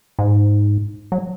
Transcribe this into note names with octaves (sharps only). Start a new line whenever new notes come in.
G#2
F#3